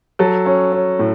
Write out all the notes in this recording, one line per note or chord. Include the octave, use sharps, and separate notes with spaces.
F#3 A4
C#4
C#4
A2